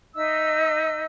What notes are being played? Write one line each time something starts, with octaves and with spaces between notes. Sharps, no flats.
D#4 D#5 E5 E6